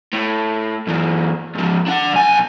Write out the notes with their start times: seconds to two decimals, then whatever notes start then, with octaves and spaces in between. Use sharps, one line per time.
0.13 A2
0.87 F#2 E3
1.55 G#2 F3
1.87 D4 F#5
2.13 B1 G#5